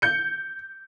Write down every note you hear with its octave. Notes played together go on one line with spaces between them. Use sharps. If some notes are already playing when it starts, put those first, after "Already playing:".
G6 C#7